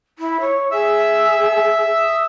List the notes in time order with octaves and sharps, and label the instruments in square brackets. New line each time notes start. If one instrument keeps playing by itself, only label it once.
[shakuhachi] E4
C#5
[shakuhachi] G#4 [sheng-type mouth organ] E5 E6
[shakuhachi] D#6